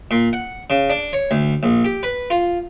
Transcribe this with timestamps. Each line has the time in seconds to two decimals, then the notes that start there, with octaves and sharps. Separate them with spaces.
0.11 A#2
0.33 F#5
0.70 C#3
0.90 D4
1.13 C#5
1.31 D2
1.63 A#1
1.84 G4
2.03 B4
2.30 F4